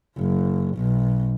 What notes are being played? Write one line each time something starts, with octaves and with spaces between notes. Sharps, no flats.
F#1
B1